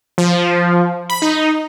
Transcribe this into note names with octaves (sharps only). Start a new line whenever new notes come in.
F3
B5
D#4